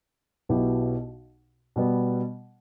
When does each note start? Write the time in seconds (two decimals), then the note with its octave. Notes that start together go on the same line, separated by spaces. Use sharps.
0.49 B1 B2 B3 E4 G4
1.76 B2 G3 B3